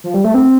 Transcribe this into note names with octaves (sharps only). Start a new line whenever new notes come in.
F3
G3
A3
C4